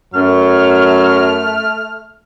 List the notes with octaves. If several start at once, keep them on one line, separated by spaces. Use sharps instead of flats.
F#2 F#3 A3 F6